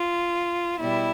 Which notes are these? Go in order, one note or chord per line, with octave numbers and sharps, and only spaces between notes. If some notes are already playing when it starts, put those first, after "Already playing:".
Already playing: F4
B2 G3 E4